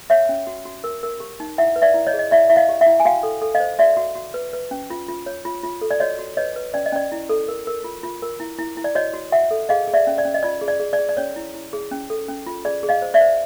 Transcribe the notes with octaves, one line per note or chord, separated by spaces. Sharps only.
C#5 E5 F#5
C#4
F#4
F#4
A#4
A#4
G4
D#4
E4 E5 F#5
B4
D5 E5
E4
C#5 D#5
G#4
D#5
E4 D5 E5
E4 E5
D#5 F5
G4
E5 F#5
E4
G#5
F#4 F5 G5
A4
A4
D#5 F5
C5
F#4 D5 E5
F#4
F#4
B4
B4
C#4
F4
F4
C#5
F4
F4
A4
D5
F#4 C#5 D#5
F#4
B4 C#5 D#5
B4
C#4 D5
D#5
C#4 D5
E4
A4
A#4
A#4
F4
F4
A#4
E4
E4
E4
D5
F#4 C#5 D#5
F#4
F#4 E5 F#5
A4
G#4 D#5 F5
G#4
D5 E5
C#4
D5
C#4
D#5
F4 D5
G#4
D5
G#4
D5
G#4
D5
C#4 C#5
E4
E4
G#4
C#4
A4
C#4
F4
G#4 D5
G#4
D#5 F5
C5
D5 E5
C5